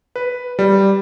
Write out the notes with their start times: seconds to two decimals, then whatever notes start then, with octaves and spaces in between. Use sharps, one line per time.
0.16 B4
0.59 G3